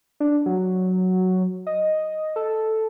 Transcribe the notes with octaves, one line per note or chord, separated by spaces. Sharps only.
D4
F#3
D#5
A4